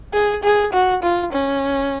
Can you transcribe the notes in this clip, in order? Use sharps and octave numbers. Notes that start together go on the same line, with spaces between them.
G#4
G#4
F#4
F4
C#4